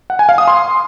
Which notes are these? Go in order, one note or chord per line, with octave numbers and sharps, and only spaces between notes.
F#5
G#5
F5
D#6
C6